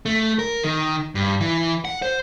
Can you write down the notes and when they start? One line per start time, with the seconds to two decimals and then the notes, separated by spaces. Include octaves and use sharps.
0.06 A3
0.39 A#4
0.64 D#3
1.15 G2
1.41 E3
1.85 F#5
2.02 C5